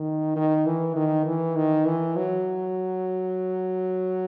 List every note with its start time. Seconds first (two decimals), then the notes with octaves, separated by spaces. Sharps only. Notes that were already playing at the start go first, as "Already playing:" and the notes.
Already playing: D#3
0.36 D#3
0.66 E3
0.96 D#3
1.26 E3
1.56 D#3
1.86 E3
2.16 F#3